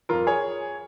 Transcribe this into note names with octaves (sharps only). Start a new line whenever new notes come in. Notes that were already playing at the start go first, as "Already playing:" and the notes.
F2 F3 F4 A#4
G#4 C#5